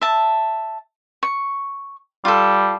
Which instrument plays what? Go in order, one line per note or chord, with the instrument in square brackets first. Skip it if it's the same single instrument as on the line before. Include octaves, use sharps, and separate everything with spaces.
[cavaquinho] E5 A5
C#6
[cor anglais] G3 [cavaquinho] F4 A4